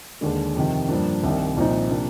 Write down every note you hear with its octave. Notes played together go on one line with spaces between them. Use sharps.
D#2 D3 G#3
F2 C3 D#3
G2 F3 A#3 D4
C2 C3 D#3
C2 A#2 F3 C4 D#4
C3 F3 A#3 D4